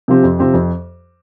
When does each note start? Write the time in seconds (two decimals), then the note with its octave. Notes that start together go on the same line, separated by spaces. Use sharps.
0.08 C3 F3 C4 G4
0.24 F2
0.39 C3 F3 C4 G4
0.54 F2